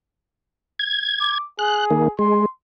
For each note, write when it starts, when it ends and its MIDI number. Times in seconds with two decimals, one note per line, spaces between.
0.79 1.38 92
1.20 1.45 86
1.59 2.12 68
1.59 1.85 90
1.90 2.08 51
1.90 2.08 58
2.19 2.46 56
2.19 2.46 84